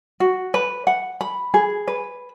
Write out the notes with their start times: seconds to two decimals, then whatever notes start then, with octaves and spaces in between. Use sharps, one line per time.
0.20 F#4
0.54 B4
0.87 F#5
1.21 B5
1.54 G#4
1.88 B4